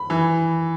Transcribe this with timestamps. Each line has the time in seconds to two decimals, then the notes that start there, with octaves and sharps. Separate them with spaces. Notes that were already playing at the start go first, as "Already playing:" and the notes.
Already playing: B5
0.10 E3